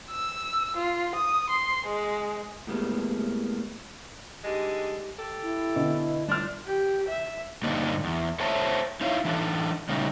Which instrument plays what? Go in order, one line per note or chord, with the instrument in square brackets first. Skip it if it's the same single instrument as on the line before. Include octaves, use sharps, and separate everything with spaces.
[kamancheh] E6
F4
D#6
C6
G#3
[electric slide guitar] A2 G3 G#3 A#3 B3
[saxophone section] D3 G#3 D#4 [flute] G4
[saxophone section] G4 A4
[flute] E4
[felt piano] B2 D3
[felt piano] G1 F6 [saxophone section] D4 [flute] C6
[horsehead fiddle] G4
E5
[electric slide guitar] G2 D3 A#3 D4 D#4
E2
A4 C5 C#5 E5 A5 A#5
D#4 E4 C#5 E5 F5
E3 D4 A4
C#3 G3 A3 C#4 D#4